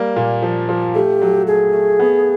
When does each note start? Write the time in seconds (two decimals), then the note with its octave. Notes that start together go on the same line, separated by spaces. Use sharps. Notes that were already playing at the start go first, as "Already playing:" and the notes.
Already playing: G3 A#3
0.16 A#2
0.42 F3
0.69 F3
0.95 A3 G4
1.22 F#3
1.47 A3 G#4
1.73 A3
2.00 B3